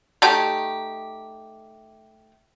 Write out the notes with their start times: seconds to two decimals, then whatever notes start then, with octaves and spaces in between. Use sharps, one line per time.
0.22 A3 D#4 G4